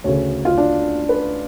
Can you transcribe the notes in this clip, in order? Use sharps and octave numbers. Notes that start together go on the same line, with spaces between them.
D2 C#3 C#5
F4
D4
B4